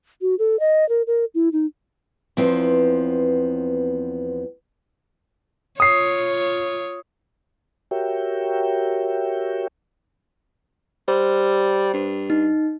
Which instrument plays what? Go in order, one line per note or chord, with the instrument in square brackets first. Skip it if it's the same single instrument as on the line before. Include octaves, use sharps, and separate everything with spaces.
[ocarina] F#4
A4
D#5
A#4
A#4
E4
D#4
[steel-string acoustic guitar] E2 F3 B3 C4
[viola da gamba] F4 C#5 [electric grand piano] D#6 C7
[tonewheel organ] F#4 G4 A#4 C#5 E5 G5
[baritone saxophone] G3 [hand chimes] C5
[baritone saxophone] G2
[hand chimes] D#4